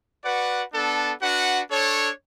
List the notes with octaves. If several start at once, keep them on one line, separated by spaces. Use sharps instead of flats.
F#4 B4 D5 F#5
B3 D4 A4
D4 F#4 B4 F#5
D4 A4 C#5